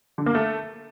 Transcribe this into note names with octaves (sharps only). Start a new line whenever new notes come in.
D3
A#3
A3